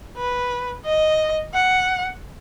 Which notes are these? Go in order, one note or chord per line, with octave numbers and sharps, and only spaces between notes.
B4
D#5
F#5